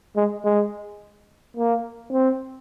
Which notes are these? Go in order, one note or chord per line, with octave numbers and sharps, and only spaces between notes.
G#3
G#3
A#3
C4